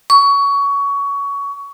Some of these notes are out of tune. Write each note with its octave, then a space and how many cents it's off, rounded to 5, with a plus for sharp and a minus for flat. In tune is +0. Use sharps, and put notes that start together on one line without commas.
C#6 +20